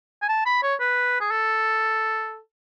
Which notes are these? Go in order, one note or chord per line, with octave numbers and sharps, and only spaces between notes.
G#5
A5
B5
C#5
B4
G#4
A4